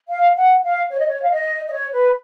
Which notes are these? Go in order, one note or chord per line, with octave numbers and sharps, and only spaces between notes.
F5
F#5
F5
C#5
D#5
C#5
F5
D#5
D#5
C#5
B4